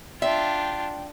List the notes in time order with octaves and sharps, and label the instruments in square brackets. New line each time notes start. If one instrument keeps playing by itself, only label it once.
[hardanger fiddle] D4 F4 [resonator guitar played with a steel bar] E5 [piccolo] G5